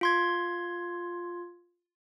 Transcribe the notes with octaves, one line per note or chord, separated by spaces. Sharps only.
F4 C6 G#6